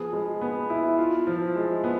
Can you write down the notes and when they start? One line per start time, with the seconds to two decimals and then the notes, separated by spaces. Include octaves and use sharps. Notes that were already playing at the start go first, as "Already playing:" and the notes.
Already playing: F3 B3 G#4
0.13 G#3
0.41 B3
0.70 E4
0.98 F4
1.27 F3
1.56 G#3
1.84 B3